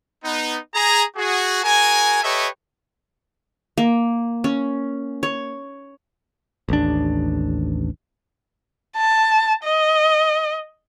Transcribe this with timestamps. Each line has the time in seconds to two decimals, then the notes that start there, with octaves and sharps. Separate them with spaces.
0.25 B3 D#4
0.75 G#4 A#5
1.17 F#4 G#4
1.63 F#4 G#4 A#4 G#5
2.23 G4 A4 B4 C#5 D#5 E5
3.78 A#3
4.44 C#4
5.23 C#5
6.69 A1 D#2 D4
8.97 A5
9.64 D#5